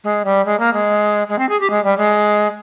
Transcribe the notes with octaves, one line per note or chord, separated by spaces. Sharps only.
G#3
G3
G#3
A#3
G#3
G#3
C4
G#4
G4
G#3
G3
G#3